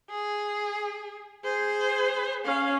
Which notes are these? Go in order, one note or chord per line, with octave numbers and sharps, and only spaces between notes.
G#4
G#4 C5
C#4 F5